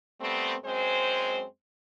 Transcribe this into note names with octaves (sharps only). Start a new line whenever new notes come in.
G3 A3 B3 C4
F#2 G#3 C4 C5